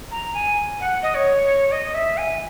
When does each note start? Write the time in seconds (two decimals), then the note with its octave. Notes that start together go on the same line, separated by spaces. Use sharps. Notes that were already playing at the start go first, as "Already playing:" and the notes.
0.11 A#5
0.34 G#5
0.81 F#5
1.03 D#5
1.15 C#5
1.72 D#5
1.94 E5
2.17 G#5